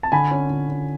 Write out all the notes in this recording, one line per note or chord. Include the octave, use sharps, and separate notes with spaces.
A5
D3 G#5 B5
C#4
D3
C#4